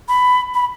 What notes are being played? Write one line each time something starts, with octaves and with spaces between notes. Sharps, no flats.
B5
B5